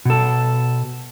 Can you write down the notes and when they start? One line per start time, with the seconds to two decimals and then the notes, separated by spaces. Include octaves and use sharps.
0.05 B2 A4